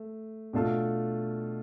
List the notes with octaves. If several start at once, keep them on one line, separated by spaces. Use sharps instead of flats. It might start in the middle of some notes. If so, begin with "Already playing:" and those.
Already playing: A3
B2 A3 D4 F4 A4